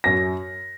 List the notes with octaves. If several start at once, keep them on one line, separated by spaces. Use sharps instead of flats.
F#2 A#6